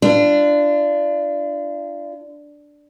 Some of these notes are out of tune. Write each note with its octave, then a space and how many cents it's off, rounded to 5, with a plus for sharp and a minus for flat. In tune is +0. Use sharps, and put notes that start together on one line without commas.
D4 +0 F4 -35